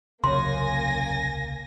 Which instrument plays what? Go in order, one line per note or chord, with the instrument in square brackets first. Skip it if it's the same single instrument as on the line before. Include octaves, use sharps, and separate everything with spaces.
[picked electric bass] D#1 C2 C#3 [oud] F#2 [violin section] A#3 G#5 A#6 [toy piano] C6